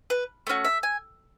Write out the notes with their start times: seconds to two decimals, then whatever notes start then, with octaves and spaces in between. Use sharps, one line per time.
0.10 B4
0.47 A3 C#4 F#4
0.65 E5
0.83 G#5